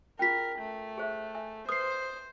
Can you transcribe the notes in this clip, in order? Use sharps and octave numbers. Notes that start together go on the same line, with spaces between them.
C#4 F4 G#4 A#4 G5 B6
A3
G#4 C5 E5
E5 G#5
B4 C5 D#6 C7